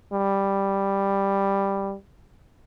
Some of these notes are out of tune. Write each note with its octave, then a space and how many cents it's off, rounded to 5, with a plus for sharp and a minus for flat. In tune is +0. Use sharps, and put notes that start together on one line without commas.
G3 +5